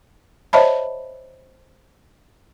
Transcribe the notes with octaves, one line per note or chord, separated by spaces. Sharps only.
C5 C#5 D#5 E5 A5 B5